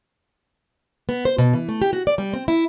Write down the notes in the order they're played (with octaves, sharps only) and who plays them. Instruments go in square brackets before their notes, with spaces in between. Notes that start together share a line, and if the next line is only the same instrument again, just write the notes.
[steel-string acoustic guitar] B3
C5
B2
E3
A3
G4
F#4
D5
G3
C4
E4